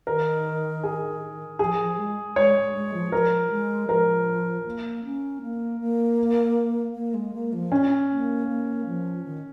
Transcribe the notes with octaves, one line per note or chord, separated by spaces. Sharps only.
D#3 A#4
G#4
F3 G#4
F3
G#3
G#3 C#5
G#3
F3
F3 A#4
G#3
F3 A#4
A#3
C#4
A#3
A#3
A#3
G#3
A#3
F3
C#4
A#3
A#3
F3
D#3